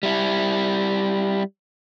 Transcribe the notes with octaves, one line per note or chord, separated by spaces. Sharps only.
G3 E4